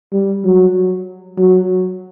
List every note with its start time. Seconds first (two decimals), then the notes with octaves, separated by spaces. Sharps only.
0.13 G3
0.45 F#3
1.38 F#3